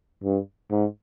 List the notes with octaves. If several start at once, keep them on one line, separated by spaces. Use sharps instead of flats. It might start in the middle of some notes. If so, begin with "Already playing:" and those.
G2
G#2